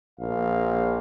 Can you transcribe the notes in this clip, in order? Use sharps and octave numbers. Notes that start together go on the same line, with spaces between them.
A#1 F5